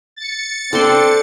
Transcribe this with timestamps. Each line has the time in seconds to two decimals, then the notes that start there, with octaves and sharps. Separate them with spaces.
0.16 A6 C#7
0.73 C4 D4 A4 C6